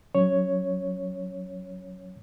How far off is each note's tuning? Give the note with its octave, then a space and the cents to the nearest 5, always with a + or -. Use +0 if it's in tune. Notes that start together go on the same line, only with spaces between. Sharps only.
F#3 +0 C#4 +0 C#5 +0